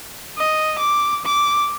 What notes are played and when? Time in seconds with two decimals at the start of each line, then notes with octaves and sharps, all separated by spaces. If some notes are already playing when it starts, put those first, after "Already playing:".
0.38 D#5
0.79 D6
1.25 D6